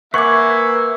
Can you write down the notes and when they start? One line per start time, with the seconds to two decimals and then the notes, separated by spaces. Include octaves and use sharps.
0.14 A#3 B4 E5 F#5 G#5 C#6 D6